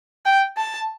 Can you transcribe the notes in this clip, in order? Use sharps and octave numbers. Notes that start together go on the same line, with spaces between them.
G5
A5